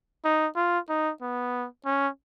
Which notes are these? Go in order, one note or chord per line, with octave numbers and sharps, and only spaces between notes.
D#4
F4
D#4
B3
C#4